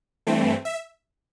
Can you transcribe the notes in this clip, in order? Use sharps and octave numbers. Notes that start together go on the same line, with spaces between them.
G2 E3 A3 C4
E5